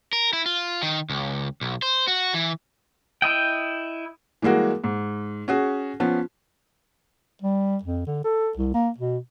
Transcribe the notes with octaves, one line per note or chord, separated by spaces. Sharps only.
A#4
E4
F4
D#3
C#2
B1
C5
F#4
E3
E4 D#5 G5
E3 G3 G#3 A#3 F#4
G#2
C#4 F#4 G#4
F3 B3 C#4
G3
F2
D3
A4
C2
A#3
B2